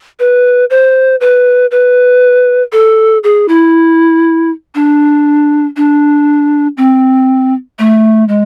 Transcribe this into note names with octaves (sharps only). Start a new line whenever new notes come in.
B4
C5
B4
B4
A4
G#4
E4
D4
D4
C4
A3
G#3